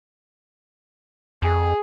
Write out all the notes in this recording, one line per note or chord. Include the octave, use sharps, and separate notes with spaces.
F2 G#4